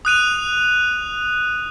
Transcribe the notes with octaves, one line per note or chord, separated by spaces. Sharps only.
D#6 F#6 D#7 F7